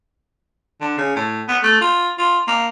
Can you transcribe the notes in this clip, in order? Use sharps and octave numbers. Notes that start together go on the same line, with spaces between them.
D3
C#3
A2
B3
A3
F4
F4
A#3